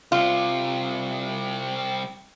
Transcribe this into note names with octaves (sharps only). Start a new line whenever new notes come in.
C2 C3 F4